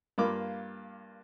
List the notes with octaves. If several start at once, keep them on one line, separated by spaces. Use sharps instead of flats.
G2 A#3 F4 B5 D6